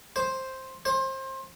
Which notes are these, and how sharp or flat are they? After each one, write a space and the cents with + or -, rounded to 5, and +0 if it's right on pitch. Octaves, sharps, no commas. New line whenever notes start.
C5 +5
C5 +25